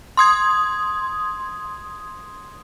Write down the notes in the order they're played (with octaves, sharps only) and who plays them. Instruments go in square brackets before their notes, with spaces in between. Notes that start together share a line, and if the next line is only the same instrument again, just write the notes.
[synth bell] C6 D#6 G#6